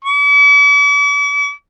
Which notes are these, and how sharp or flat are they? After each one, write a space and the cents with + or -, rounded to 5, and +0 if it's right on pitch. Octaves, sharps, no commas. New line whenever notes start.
D6 -45